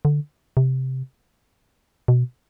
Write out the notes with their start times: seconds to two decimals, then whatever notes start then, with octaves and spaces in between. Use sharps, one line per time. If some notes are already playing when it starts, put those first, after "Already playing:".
0.05 D3
0.57 C3
2.08 B2